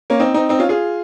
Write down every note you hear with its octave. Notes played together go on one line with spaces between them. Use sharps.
A#3 C#4
C4 D#4
C4 D#4
C4 D#4
C#4 F4
F4 G#4